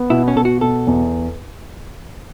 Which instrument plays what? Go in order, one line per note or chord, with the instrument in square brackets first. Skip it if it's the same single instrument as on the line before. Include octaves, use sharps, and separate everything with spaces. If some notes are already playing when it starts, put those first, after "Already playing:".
Already playing: [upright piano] B3
[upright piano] B2 [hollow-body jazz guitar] E4
[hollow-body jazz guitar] C#4
[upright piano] B2 [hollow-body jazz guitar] A4
[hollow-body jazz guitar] F#4
[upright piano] B2 [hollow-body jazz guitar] A4
[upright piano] E2